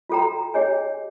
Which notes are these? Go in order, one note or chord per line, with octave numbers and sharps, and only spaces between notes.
F4 F#4 A4 G5 A#5
D4 G4 G#4 C#5 D#5 G#5